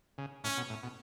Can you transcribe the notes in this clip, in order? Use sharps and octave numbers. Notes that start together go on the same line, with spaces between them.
C#3
A2 C#4
B2
A2
B2